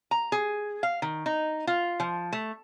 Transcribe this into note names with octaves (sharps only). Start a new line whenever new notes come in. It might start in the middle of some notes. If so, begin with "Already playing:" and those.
A#5
G#4
F5
D#3
D#4
F4
F3
A3